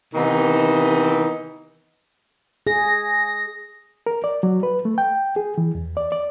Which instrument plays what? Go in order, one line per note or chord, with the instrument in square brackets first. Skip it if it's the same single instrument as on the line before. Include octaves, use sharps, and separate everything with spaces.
[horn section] C3 D#3 E3 B3 D#4
[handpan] G#4 [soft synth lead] A#6
[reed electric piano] A#4
D5
F#3
B4
A3
G5
G#4
E3
E2
D5
D5